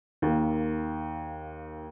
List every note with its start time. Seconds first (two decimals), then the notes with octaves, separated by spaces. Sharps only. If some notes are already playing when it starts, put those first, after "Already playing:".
0.22 D#2 A#3